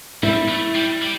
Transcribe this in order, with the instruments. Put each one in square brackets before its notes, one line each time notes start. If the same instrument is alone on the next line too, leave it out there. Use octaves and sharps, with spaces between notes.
[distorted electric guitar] G3 [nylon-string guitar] E4
[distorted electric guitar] A3
G3
G3